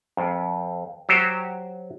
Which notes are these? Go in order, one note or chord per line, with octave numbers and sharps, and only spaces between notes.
F2
F#3 F#4 G4 C5